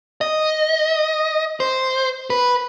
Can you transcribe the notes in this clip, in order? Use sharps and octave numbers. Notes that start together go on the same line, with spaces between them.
D#5
C5
B4